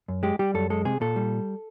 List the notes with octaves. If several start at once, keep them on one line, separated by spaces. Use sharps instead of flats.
F#2
G#3 G4
G3 G4
F#2 A4
G#3 A4
C3 G#4
A#2 A4
G3